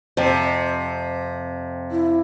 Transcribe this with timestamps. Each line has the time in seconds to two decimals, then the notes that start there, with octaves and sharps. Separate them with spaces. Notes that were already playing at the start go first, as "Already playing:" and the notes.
0.17 F2 C3
1.91 E4